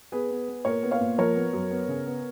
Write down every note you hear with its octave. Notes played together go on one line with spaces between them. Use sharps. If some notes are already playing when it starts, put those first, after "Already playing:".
B3 G#4 B4
B3
B3
A#2 A#4 C#5
B3
C#5 F5
A#2
F3 A#4 C#5
B3
F#2
B3
C#3
B3